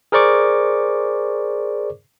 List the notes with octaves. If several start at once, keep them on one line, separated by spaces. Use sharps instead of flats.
G#4 A#4 C5 D5 C#6 D6